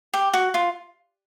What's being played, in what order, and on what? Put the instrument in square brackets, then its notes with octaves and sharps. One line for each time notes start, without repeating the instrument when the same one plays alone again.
[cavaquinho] G4
F#4
F4